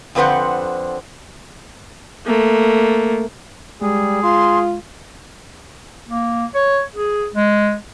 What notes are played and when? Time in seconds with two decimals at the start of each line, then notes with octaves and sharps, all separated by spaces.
0.15 F2 D3 C4 B4 C5 F#5
2.26 A3 A#3
3.82 G3 G#3 G#4
4.23 F4 C6
6.09 A#3
6.55 C#5
6.95 G#4
7.34 G#3